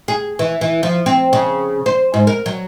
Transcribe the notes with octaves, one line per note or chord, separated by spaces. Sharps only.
G#4
E3
E3
F3
C4
C#3
C5
G#2
A#4
F#3